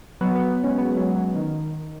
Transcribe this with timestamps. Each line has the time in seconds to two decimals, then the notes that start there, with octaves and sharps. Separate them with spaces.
0.21 F#3 B3
0.35 F#3 B3
0.64 G#3 C#4
0.78 F#3 B3
0.97 F#3
1.16 F#3
1.35 D#3